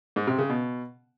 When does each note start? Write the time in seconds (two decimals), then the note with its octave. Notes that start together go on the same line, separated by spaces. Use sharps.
0.16 G#2
0.27 C3
0.38 C#3
0.50 B2